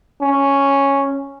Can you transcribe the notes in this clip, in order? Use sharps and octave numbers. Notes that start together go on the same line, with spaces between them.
C#4